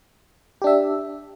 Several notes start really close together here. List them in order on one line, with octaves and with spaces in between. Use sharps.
G4 D4 E5